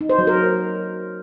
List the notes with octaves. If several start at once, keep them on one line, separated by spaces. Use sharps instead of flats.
D#4
C5
F#3
A#4